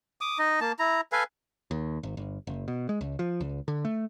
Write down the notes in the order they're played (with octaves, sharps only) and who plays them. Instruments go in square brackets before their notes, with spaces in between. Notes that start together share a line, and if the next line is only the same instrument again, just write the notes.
[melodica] D6 D#6
D#4 D#5
A#3 A5
E4 A#5
A4 B4 F5 G#5
[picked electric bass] D#2
G#1
G1
F#1
B2
G#3
C#2
F3
C#2
D3
A3